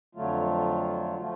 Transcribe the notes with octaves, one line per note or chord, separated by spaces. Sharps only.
F2 D3 F#3 A3 F4
F3 A3 F4